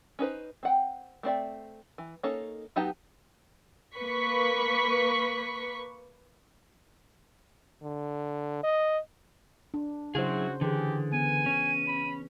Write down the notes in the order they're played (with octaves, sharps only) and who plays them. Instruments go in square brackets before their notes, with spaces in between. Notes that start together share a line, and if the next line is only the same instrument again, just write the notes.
[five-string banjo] C#4 D#4 B4 C5
C4 F#5 G5
A3 C4 D5 E5
E3
A#3 C#4 D#4 A4 C#5
F#3 B3 D#4 G4 A5
[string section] A#3 B4 C#6 B6
[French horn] D3
D#5
[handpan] D4
[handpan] C#3 C5 [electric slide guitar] F#3 E4 G#4 [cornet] F#4
[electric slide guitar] D3 [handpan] E3 G#4 [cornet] G4
[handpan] B3 [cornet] G#5 [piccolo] D#7
[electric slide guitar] C#4
[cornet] B5